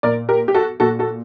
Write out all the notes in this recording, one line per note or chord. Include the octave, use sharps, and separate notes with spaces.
A#2 A#4 D5
G4 A#4
G4
F#4 A4
A#2 F#4 A4
F#4 A4